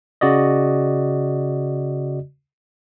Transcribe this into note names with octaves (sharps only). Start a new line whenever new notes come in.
C#3 F#4 D5 D#5